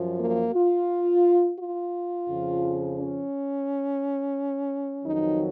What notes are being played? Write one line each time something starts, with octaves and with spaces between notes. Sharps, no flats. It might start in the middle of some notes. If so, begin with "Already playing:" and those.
Already playing: F#2 F3
A#3
F4
F4
F2 C#3 F3
C#4
F2 D#3 F#3 D#4